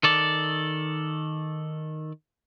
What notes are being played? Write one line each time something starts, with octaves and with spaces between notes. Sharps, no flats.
D#3 A4 D5